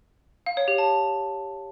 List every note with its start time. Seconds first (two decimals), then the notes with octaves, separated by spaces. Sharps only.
0.46 F5
0.57 C#5
0.68 G4
0.78 A5